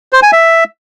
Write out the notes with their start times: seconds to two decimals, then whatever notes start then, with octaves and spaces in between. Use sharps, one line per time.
0.13 C5
0.23 G#5
0.33 E5